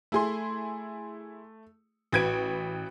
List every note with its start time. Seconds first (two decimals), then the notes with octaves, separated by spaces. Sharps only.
0.12 A3 E4 G#4 C6
2.12 A1 F#4 B4 G#6 D7